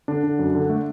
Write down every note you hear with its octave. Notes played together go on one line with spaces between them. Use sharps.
D3 D4
D3
F#2
D3
A3